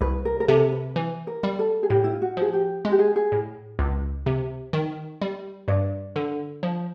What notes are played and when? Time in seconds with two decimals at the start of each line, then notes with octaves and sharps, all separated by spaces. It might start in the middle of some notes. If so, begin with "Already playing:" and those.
0.01 C2 B4
0.25 A#4
0.40 A#4
0.48 C3 A4
0.72 B4
0.96 E3
1.27 A#4
1.43 G3
1.59 A4
1.83 G#4
1.90 A2 G4
2.04 E4
2.12 F4
2.22 F#4
2.37 F3 G#4
2.53 G4
2.85 G#3 G#4
2.92 G4
2.99 G#4
3.16 G#4
3.32 A2
3.79 C#2
4.26 C3
4.73 D#3
5.21 G3
5.68 G2 D5
6.16 D3
6.63 F3